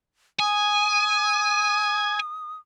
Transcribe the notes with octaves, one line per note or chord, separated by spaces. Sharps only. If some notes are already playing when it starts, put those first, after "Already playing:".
G#5 D#6